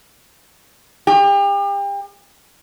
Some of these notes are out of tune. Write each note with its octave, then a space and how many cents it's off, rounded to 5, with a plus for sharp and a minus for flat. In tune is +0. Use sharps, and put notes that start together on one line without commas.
G4 +35